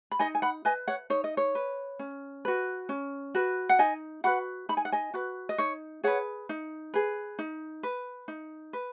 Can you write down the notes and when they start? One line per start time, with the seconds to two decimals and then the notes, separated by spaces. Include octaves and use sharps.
0.12 B5
0.19 D#4 D#5 G#5
0.35 G#5
0.42 F#5 B5
0.65 B4 D#5 G#5
0.88 C#5 F#5
1.10 D#4 C#5
1.24 D#5
1.37 C#5
1.55 B4
1.99 C#4
2.45 F#4 B4
2.89 C#4
3.35 F#4 B4
3.69 F#5
3.79 D#4 D#5 G#5
4.24 F#4 B4 F#5 B5
4.69 D#4 B5
4.77 G#5
4.85 F#5
4.92 D#5 G#5
5.14 F#4 B4
5.49 D#5
5.58 D#4 C#5
6.04 G#4 B4 C#5 F#5
6.49 D#4
6.94 G#4 B4
7.39 D#4
7.83 B4
8.28 D#4
8.73 B4